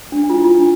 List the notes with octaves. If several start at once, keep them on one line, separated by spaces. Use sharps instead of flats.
D4
D4
F4
E4
F4
D4